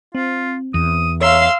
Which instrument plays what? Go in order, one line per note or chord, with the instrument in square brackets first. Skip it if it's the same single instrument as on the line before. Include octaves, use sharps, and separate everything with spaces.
[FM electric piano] C4 [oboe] F4
[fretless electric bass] E2 [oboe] D#6
[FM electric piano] C#5 A#5 [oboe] E5 [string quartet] F5 C6 E6